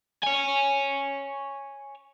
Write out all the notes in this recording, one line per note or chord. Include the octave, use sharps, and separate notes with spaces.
C#5 G#5